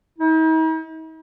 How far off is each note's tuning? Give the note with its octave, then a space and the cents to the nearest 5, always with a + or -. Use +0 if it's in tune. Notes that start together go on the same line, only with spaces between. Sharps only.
D#4 +45